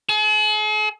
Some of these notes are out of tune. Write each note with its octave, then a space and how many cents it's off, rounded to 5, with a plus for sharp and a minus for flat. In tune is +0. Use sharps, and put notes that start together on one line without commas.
G#4 +45